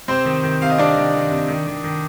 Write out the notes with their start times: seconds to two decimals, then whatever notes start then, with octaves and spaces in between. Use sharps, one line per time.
0.08 C3 C4 C5
0.25 D#3
0.43 D#3
0.61 C3 F5
0.70 D#5
0.78 C3 D4 D5
0.97 D#3
1.14 D#3
1.31 C3
1.48 D#3
1.67 D#3
1.84 D#3